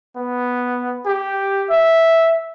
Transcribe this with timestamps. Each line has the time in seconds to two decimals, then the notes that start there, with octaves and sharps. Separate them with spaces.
0.16 B3
1.06 G4
1.70 E5